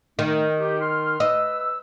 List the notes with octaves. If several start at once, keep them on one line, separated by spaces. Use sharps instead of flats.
D#3 A3 D#4
D#4 G4
C6 F6
B4 D#5 E6